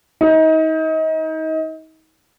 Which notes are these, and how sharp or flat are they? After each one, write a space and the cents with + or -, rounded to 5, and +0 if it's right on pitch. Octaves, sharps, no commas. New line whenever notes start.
D#4 +30